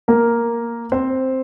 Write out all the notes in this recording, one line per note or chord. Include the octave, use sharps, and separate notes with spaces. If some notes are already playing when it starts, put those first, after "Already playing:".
A#3 A#4
C4 C5